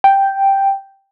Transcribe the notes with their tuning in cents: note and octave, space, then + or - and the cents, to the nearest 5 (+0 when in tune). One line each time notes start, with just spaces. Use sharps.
G5 +0